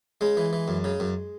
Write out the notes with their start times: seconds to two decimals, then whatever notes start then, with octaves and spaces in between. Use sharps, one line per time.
0.21 C#3 G#3
0.37 E3
0.53 E3
0.68 F#2
0.84 C#3
1.00 F#2